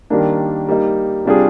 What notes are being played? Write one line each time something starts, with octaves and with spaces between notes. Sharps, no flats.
D#3 G3 A#3 D4
G3 A#3 D#4
C3 G3 D4 F4 G#4